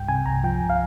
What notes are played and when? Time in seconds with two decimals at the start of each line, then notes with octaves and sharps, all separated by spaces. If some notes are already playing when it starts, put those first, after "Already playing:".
Already playing: C2 G2 G5
0.08 C3 G#5
0.26 C2 A#5
0.44 F3 G5
0.61 C2
0.70 F5